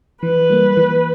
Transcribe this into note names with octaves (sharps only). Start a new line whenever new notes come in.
E3 B4
G3 A#3
E3